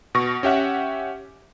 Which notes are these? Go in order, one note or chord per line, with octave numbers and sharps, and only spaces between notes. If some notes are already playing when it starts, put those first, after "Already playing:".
B2 C#6 A#6
C#4 G4 E5 F#5